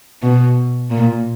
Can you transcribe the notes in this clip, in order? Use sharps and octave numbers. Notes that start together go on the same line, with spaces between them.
B2
A#2